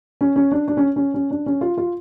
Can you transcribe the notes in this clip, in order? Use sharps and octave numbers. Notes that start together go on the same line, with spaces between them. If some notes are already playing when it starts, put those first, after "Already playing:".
C#4
C#4
D4
D4
C#4
C#4
C#4
D4
C#4
F4
F4